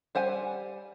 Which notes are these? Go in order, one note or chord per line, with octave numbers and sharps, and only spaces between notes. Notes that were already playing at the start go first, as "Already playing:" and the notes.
G3 C5 F#5 G#5